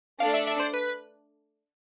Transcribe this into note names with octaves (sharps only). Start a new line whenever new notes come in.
A3 D4 A4 D5 F5
E5
E5
C5
B4